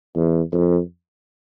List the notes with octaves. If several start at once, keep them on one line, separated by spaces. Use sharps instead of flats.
E2
F2